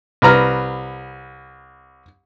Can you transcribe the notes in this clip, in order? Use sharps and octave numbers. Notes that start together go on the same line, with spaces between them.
C2 B4 A#5 F6